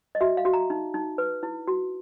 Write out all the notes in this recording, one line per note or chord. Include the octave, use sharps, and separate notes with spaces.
D#5
F#4 E5
F5
F#4
A#5
D#4
D#4
B4
E4
F#4